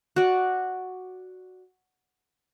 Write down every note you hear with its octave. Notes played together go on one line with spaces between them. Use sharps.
F#4 D5